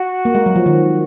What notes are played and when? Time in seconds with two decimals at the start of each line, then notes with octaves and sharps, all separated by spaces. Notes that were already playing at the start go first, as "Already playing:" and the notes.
Already playing: F#4
0.25 A#3
0.35 G#3
0.46 F#3
0.56 F3
0.66 D#3